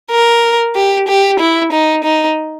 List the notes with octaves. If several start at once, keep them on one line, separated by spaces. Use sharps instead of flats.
A#4
G4
G4
E4
D#4
D#4